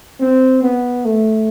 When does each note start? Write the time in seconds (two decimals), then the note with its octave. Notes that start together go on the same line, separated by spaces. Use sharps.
0.20 C4
0.63 B3
1.05 A3